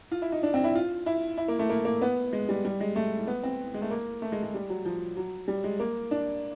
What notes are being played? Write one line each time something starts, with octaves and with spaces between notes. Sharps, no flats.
F4
E4
D#4
D4
C4
E4
F4
E4
E4
A#3
A3
A#3
A#3
B3
G#3
G3
G3
G#3
A3
B3
C4
G#3
A3
A#3
A3
G#3
G#3
G3
F#3
F3
F#3
G3
G#3
A#3
D4